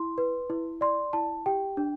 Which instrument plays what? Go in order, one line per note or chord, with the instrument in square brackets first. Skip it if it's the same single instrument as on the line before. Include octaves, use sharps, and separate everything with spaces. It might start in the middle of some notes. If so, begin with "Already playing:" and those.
Already playing: [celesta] E4 C6
B4
E4
D5 C6
E4 A5
G4 G5
D4